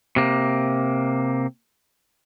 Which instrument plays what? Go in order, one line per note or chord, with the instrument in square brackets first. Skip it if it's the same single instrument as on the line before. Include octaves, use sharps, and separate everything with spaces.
[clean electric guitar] C3 A#3